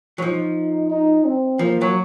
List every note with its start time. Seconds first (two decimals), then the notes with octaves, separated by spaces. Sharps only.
0.18 F#3
0.22 F3 D#4
0.90 D#4
1.25 C4
1.59 F3 A#3
1.81 F#3